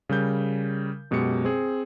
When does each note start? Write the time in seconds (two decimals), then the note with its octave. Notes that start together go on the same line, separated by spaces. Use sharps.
0.09 C#3 G3 A#4 G6
1.11 F#2 B2 G#3 G4 C#7
1.45 C4 G#4